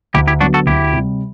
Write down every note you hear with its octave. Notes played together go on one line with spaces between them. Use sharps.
D2 E4 G4
E4 G4
D3 F#3 B3 D4 F#4
F#4 A4
D2 E4 G4
C3 G3